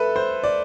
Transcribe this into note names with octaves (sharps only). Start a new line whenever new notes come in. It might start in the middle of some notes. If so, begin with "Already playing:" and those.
Already playing: A4 B4 E5
C5
D5